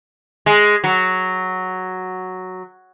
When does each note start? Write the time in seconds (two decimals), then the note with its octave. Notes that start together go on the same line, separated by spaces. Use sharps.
0.46 G#3
0.84 F#3